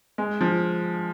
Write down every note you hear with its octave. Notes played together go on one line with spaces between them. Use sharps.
G#3
F3